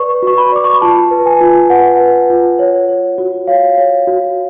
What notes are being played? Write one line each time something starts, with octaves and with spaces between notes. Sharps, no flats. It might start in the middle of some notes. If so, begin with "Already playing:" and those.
Already playing: B4 D5 C#6
F#4 C#6
B5
D5 D6
C#6
B5
F4 A5
B4
G#5
F4
B4 F#5
B4
F4
C#5
C#5
F#4
C#5 F5
C#5
F#4